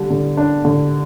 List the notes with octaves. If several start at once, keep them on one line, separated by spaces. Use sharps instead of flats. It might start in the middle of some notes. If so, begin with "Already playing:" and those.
Already playing: D3 G3
D3
D4
D3